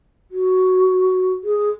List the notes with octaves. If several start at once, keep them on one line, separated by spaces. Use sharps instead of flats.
F#4
G#4